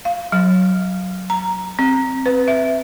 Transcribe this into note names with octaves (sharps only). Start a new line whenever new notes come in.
F5
F#3
A#5
C4
B4
E5